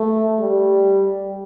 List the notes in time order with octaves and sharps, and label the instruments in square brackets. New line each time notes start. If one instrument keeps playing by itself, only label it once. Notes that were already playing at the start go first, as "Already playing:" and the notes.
Already playing: [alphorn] A3
G3